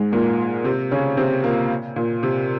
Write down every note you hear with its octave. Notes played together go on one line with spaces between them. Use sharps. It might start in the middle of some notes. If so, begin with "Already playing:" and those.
Already playing: G#2 G#3
A#2 A#3
C3 C4
C#3 C#4
C3 C4
A#2 A#3
A#2
C3